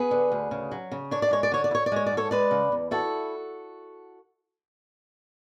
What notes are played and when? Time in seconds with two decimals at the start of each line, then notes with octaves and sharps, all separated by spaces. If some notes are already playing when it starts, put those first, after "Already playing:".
Already playing: B3 G#4 B4
0.11 D3
0.32 D2
0.51 C#3
0.72 F#3
0.92 C#3
1.11 D4 C#5
1.22 D5
1.31 G#3 C#5
1.43 D5
1.52 D3 C#5
1.64 D5
1.71 E4
1.75 C#5
1.86 D5
1.92 G#3 C#5
2.06 D5
2.12 G#2
2.17 A4 C#5
2.31 G#3 B4 D5
2.51 C#3
2.72 E2
2.91 E4 F#4 A4